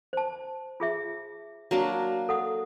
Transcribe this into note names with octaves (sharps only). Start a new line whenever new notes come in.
C5 A5
F4 G#4 E5
F#3 A#3 D4
A4 F#5 D#6